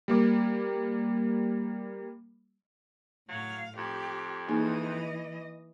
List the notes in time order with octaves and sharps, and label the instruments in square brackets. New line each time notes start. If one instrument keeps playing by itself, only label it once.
[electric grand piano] G3 A#3 D6
[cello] A2 F5 [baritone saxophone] F#3
[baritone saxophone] F2 [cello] G4
[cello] E3 D#5 [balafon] A#3 D#4 G#4